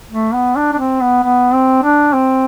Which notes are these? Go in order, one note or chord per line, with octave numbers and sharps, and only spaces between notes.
A3
B3
D4
D4
C4
B3
B3
C4
D4
C4